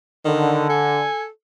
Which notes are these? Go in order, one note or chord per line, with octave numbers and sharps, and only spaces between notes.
D3 D#3
A4 G#5